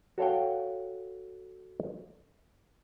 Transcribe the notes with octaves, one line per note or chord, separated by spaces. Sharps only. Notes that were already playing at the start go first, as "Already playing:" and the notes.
F#4 A4 C#5 F5 G5